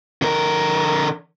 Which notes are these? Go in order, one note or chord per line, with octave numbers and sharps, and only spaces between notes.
D3 A#4